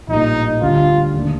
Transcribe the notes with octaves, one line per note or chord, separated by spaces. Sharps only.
A#1 A2 G3 A#3 D#4
D2 D3 G3 D4 F4
D#2 D3 A3 D4